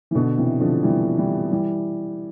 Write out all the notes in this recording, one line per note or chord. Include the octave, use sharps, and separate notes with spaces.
E3
B2 D3
C3 E3
D3 F3
E3 G3
E3 G3
E3 G3